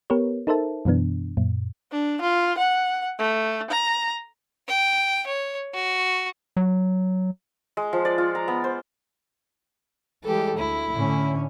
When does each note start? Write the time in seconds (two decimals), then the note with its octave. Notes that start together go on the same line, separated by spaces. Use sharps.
0.10 B3 G4 A#4 B4 C#5
0.47 D#4 A4 A#4 C5 E5 A5
0.85 F#2 B2 E3 B3 D4
1.37 F#2 A#2
1.92 D4
2.22 F4
2.58 F#5
3.19 A3
3.71 A#5
4.68 G5
5.27 C#5
5.74 F#4
6.57 F#3
7.77 G#3
7.93 F3
8.05 D5
8.18 F4
8.35 A#5
8.48 B3
8.64 C5
10.24 E3 G3 G#3 G4 A4
10.57 D2 E4
10.93 A2 D3 C#4